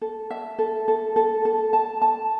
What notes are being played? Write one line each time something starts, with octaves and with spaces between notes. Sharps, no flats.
A4
E5
A4
A4
A4
A4
A5
A5